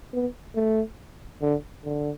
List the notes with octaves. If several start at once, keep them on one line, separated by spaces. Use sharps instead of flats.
B3
A3
D3
D3